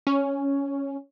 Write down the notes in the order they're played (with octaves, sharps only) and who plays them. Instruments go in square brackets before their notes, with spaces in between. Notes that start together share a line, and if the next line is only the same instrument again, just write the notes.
[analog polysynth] C#4